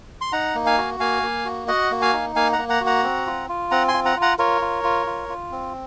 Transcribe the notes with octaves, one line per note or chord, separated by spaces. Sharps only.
C6
D#4 F#5 A#5
A#3
F5 G#5
F#4
A#3 F5 G#5
A#3
F#4
F#4 D#5 F#5
A#3
F5 G#5
D#4
A#3 F5 G#5
F#5 A#5
A#3
F#5 A#5
F#4
F#5 A#5
C4
F4
F4
C4 F#5 A#5
G#5 C6
F4
F#5 A#5
F4
F#5 A#5
F4 A#4 C#5
F4
F4
F4
F4
C4